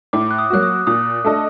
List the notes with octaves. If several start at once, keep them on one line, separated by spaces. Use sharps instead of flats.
A2 D6
F#6
D#6
F#3 A#3 F#4 F#6
D#6
A#2 D#6
A3 D4 A4 D#5